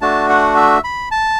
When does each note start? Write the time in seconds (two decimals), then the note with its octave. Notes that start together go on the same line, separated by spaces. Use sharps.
0.01 A3 D4 F#4 A5
0.29 F#5
0.56 E5
0.84 B5
1.11 A5